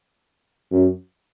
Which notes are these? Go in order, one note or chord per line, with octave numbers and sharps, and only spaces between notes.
F#2